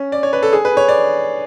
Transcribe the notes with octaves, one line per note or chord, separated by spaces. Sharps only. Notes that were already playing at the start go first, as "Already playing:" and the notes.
Already playing: C#4
D5
C#5
B4
A4
G#4
B4
C#5
D5